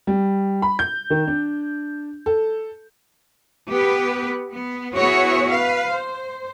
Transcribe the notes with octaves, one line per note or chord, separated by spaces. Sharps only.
G3
B5
G6
D#3
D4
A4
B3 G4 B4
B3
B3 E4 F#4 G#4 C#5
B4 F5
C5